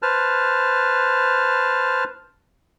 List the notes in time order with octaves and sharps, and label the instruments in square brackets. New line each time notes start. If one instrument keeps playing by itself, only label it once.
[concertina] B4 C5 A5 F6